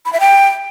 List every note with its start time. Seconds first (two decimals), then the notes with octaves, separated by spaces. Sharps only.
0.05 B5
0.13 E5
0.20 G5